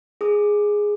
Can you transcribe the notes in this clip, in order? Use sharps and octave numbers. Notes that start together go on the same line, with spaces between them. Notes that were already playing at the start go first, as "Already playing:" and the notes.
G#4 D#6